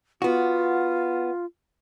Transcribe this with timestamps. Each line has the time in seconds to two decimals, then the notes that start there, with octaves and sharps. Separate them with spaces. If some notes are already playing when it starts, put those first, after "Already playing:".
0.22 B3 F4 F#4